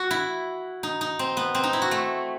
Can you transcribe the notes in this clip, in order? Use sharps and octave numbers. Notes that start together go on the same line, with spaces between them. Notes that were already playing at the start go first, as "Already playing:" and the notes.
Already playing: F#4
E4
D#4
D#4
C4
B3
C4
D#4
E4
F#4
A3